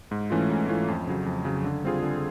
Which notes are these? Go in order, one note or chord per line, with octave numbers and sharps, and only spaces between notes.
G#2
E3 A3 C#4 F4
G#2
E3 A3 C#4 F4
F2
C#3 F#3
F2
C#3 F#3
D3
G3 C4 F4 G#4
D3